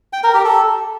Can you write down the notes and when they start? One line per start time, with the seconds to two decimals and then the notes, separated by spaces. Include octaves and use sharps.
0.13 G5
0.24 A#4
0.34 G4
0.45 A4